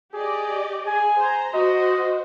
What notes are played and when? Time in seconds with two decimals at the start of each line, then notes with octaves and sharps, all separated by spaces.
0.13 G4 G#4 D5 D#5
0.87 G#4 G#5
1.17 C5 A#5
1.54 F#4 C5 D#5